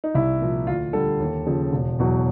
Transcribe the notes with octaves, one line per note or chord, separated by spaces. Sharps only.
D#4
C2 E4
A#2 F3
D2 F4
D3 G3 A4
D#2
C#3 F3
E1
E2 B2 F#3